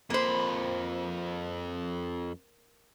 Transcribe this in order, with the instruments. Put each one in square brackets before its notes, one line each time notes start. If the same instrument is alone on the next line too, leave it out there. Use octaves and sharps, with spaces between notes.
[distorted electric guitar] F2 B5 [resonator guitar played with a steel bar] A#3 C5